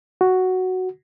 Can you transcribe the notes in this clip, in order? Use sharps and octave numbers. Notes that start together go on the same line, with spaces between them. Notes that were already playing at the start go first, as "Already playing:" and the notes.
F#4